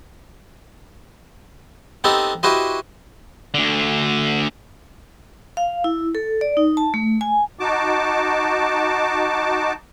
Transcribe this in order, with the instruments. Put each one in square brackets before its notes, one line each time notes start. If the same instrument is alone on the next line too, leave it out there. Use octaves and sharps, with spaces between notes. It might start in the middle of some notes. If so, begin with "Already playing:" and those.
[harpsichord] B3 C4 D#4 G4 A4
E4 F#4 G4 B4 C5 D#5
[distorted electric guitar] D2 D3
[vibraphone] F5
E4
A4
D5
D#4
A5
A3
G#5
[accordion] D#4 F#4 A5 D6